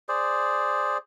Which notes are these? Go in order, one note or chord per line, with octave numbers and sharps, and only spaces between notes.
G#4 C5 D5